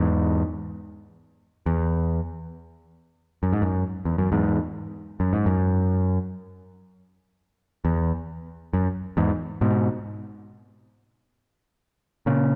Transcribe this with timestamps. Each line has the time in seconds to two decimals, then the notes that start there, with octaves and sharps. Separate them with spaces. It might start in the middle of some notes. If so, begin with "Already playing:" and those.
Already playing: E2 G#2
1.66 E2
3.43 F#2
3.53 G#2
3.62 F#2
4.05 E2
4.18 F#2
4.32 E2 G#2
5.20 F#2
5.33 G#2
5.46 F#2
7.85 E2
8.73 F#2
9.17 E2 G#2
9.61 G#2 B2
12.26 A#2 C#3